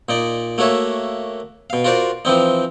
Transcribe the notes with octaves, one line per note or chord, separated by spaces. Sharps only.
A#2 D#4 D5
A3 A#3 F#4 C#5 E5
B2 F5
F4 F#4 A#4 C5 D5
E3 F3 C4 D#4